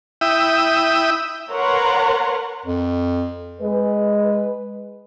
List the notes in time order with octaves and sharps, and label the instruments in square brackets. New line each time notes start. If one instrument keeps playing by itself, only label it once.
[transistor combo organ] E4 E5 G5 D#6
[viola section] A#4 B4 C#5 F#5 A#5 C6
[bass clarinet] F2
[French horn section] G#3 B4